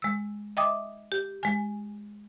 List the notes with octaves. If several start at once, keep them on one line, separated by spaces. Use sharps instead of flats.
G#3 E6
D#5 E5 G5 D6 D#6
G4
G#3 G#5